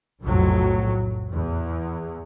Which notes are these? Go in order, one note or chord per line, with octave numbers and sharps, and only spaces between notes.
F1 B1 F2 A2 F#3
E2